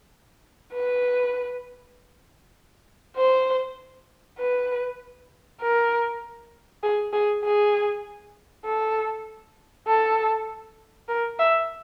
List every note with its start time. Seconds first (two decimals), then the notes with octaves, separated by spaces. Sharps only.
0.73 B4
3.16 C5
4.39 B4
5.61 A#4
6.83 G#4
7.13 G#4
7.44 G#4
8.65 A4
9.87 A4
11.08 A#4
11.39 E5